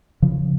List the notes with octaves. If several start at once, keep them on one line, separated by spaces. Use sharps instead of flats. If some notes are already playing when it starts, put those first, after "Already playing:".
C#3 F3